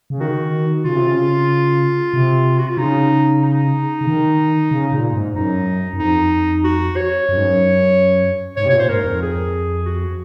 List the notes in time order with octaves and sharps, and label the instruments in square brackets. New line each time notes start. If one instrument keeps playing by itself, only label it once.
[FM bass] C#3
[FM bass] D#3 [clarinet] F#4
[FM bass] C#3 [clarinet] F4
[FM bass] C3
C#3
C3
[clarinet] F#4
F4
[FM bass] C#3 [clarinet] D#4
[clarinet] D#4
[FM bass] C#3
D#3
C#3
A#2
G#2
[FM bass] F#2 [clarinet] D#4
[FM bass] F#2
[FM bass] F2 [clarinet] D#4
[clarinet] F#4
C#5
[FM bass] F#2
G#2
F#2
[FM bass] G#2 [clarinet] C#5
[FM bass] C3
[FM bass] A#2 [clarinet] C#5
[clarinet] C5
[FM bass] G#2 [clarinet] A#4
[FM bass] F2
[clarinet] G#4
F#4